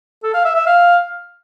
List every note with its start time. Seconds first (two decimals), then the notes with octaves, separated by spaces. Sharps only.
0.23 A4
0.34 F5
0.45 E5
0.56 E5
0.67 F5